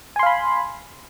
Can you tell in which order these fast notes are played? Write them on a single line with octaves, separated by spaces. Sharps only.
G#5 C6 F5 B5